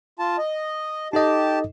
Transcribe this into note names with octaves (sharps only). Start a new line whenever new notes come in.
F4 A5
D#5
D#4 G4 A4 D#5 A5